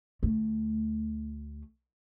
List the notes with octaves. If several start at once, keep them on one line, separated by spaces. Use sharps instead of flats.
D2 A3